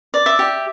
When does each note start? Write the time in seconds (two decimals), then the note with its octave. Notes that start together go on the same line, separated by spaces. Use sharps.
0.14 D5
0.26 E5
0.39 G4